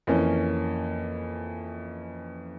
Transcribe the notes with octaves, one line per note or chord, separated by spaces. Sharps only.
F2 E3 A#3 C#4